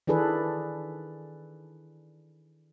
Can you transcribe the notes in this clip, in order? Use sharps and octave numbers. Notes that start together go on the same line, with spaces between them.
D#3 E3 D4 G#4 A4 B4